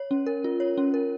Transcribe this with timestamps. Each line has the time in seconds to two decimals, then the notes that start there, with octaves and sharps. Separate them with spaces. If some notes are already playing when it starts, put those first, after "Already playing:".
Already playing: C#5
0.11 C#4
0.26 A#4
0.44 F4
0.60 C#5
0.77 C#4
0.94 A#4